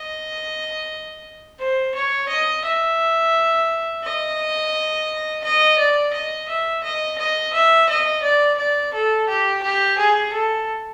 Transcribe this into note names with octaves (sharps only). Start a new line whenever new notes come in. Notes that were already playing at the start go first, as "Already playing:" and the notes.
Already playing: D#5
C5
C#5
D#5
E5
D#5
D#5
D5
D#5
E5
D#5
D#5
E5
D#5
D5
D5
A4
G4
G4
G#4
A4